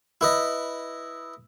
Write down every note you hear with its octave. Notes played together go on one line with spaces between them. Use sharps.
E4 B4 D#5